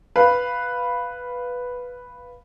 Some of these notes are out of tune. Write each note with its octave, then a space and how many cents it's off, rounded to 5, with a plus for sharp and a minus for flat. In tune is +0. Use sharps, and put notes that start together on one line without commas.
B4 +0 F5 +0